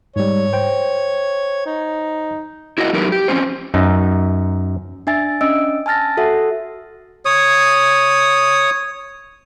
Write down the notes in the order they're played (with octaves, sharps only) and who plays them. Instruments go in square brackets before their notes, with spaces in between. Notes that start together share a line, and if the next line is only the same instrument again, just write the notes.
[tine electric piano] G#2 G3 [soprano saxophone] C#5
[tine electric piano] C5 G5
[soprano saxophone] D#4
[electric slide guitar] E4 F#4 A#4 D#5 F5 F#5
F#3 A3 D#4 G4 A#4 B4
G4
F3 G3 C4 C#4 C5
[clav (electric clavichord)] F#2 D#4
[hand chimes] D4 E5 G#5 A6
C#4 D4 D#5 E6 D7
G#5 A5 F6 A6 A#6
F#4 A4 E5 F#5
[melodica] C#5 D#6